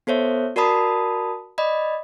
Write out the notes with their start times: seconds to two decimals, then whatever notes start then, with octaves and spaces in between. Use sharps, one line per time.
0.07 B3 A4 C5 C#5 E5
0.56 F#4 A#4 D5 A5 B5 D#6
1.58 D5 D#5 B5